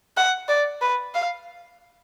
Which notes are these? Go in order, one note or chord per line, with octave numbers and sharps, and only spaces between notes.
F#5
D5
B4
F5